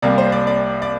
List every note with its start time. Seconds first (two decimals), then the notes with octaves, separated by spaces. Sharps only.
0.02 C2 C3 G3 A#3 D5
0.18 C5
0.32 D5
0.47 D5
0.82 D5